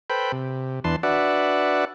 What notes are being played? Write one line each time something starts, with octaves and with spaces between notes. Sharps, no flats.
A4 B4 C5 G5 B5
C3
E2 E3 D4 B4 A5 C6
D4 F#4 B4 D5 E5 F#5